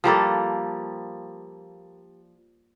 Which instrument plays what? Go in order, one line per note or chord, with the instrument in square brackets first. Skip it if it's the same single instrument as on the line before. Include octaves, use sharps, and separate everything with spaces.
[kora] F3 G3 A#3 A4